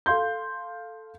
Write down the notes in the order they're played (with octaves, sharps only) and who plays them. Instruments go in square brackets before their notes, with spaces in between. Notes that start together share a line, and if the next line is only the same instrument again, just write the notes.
[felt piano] A4 F5 C6 G6